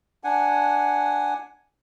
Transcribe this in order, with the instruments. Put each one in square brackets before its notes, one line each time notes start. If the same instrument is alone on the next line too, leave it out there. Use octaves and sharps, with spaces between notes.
[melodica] D4 F#5 G#5